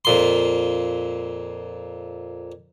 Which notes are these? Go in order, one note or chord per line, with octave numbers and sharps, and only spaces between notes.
F2 A#2 C6